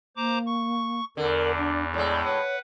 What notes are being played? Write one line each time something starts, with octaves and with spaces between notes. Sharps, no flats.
A#3 C5 A#5 D6
C#6
E2 D3 A#4
D4
A2 G#3 D5
B4 C#5 F#5